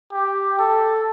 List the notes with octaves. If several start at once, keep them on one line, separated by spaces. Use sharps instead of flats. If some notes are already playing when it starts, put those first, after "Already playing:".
G4
A4